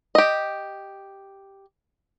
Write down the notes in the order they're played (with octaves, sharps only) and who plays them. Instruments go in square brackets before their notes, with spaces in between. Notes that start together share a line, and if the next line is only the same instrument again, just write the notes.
[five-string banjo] G4 D#5